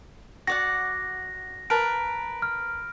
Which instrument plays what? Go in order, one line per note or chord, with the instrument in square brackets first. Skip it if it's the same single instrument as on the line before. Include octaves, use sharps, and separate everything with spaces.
[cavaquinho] F#4 D5 F#5 [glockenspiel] A#6
[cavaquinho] A#4 B4 A5 [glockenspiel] D7
[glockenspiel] F6